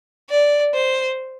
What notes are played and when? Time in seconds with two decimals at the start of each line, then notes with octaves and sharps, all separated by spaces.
0.30 D5
0.74 C5